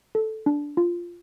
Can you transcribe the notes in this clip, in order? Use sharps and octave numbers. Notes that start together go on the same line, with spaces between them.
A4
D4
F4